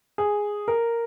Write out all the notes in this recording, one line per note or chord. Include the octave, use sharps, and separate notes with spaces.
G#4
A#4